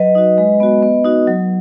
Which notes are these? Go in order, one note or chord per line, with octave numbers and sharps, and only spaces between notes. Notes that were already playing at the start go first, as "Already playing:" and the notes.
Already playing: F#3 B4 D#5
D#4 F#4
G#3
B3 F#4
B3
D#4 F#4
F#3